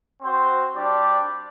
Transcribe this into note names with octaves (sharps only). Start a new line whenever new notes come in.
C4 F#4 C5
G3 D4 G4 D5